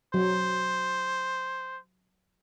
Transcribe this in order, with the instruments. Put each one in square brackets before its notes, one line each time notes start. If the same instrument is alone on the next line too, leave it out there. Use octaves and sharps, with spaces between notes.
[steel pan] F#3 [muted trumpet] C5